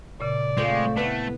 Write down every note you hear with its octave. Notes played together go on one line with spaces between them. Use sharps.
A#2 C#3 D5
G#3 A3 C4 F4
A3 B3 E4